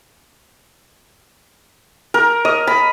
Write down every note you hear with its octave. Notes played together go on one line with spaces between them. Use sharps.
A#4
D#5
B5